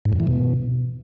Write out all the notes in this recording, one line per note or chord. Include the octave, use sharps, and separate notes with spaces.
G#2
F2
E3
B2